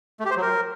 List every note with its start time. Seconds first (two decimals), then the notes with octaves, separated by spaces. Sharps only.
0.20 A3
0.25 G4
0.31 C5
0.36 F#3
0.42 A#4